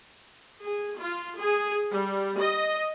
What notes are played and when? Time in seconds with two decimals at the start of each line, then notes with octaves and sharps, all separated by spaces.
0.62 G#4
0.98 F4
1.37 G#4
1.92 G3
2.39 D#5